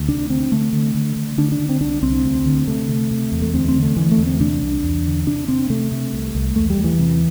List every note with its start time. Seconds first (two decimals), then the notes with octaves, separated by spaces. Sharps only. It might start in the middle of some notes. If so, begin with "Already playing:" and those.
Already playing: D2
0.08 C3 D4
0.30 D2 C4
0.51 D3 A3
0.73 D3
0.95 D3
1.16 D3
1.38 D3 D4
1.52 D4
1.60 D3
1.69 C4
1.81 C2 D4
2.03 C2 C4
2.24 D2
2.46 D3
2.67 C3 A3
2.89 C3
3.11 C3
3.32 E2
3.42 A3
3.53 D2 C4
3.69 C4
3.75 D3
3.82 A3
3.96 D3 E3
4.11 A3
4.18 E2
4.26 C4
4.40 C3 D4
4.62 C2
4.83 E2
5.05 D3
5.26 C3 D4
5.48 C3 C4
5.70 C3 A3
5.92 C3
6.13 C2
6.35 C2
6.56 E2 A3
6.70 G3
6.78 E2
6.84 E3
6.99 C3